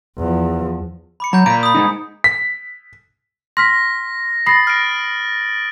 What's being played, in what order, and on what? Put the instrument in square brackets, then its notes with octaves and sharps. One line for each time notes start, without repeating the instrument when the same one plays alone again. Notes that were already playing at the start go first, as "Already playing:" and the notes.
[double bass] E2 F3
[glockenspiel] B5 D6 C#7
[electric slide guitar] F#3 [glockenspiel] A#5 G6
[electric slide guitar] A#2 A#5 [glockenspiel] B6 D7
[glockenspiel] B5 D#6
[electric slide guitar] G#3 A#3 D#4
[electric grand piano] B6
[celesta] C6 F6 B6 [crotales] A#6
[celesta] B5 A#6 C7 [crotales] D#6 A6
[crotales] F6 D7